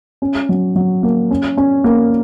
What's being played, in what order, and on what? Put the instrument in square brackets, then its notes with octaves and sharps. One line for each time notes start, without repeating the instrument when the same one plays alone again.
[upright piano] C#4
F#3
F#3
A#3
C#4
C#4
A#3